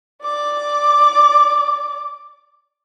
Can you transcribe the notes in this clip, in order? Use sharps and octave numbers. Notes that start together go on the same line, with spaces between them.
D5 D6